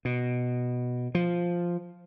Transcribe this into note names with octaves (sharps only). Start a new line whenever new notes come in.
B2
F3